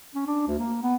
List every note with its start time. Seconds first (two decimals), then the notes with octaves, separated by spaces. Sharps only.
0.15 C#4
0.27 D4
0.47 D2
0.59 A#3
0.83 B3